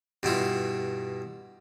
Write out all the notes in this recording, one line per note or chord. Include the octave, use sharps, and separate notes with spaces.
G2 B2 E4 F4